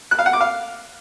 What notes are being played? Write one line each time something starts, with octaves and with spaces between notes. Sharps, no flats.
F#6
F5
F#5
D6
F5